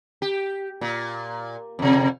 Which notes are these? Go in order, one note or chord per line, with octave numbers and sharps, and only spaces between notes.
G4
A#2
F2 C3